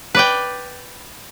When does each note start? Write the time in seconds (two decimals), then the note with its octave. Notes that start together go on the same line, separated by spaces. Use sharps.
0.15 B4 D5 G5